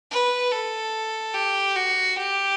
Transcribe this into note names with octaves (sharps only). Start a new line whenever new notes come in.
B4
A4
G4
F#4
G4